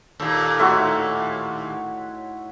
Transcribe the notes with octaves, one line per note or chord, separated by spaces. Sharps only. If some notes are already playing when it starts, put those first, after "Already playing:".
D#2 A#2 A4
A2 D#4 F#4 C#5 E5 C6